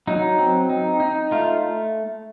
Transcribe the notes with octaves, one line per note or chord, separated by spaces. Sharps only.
F#3 D#4
C4
D#4
D#4
A3 F4